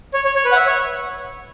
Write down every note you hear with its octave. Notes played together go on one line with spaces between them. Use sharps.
C#5
C#5
C#5
B4
F#5
E5
C#5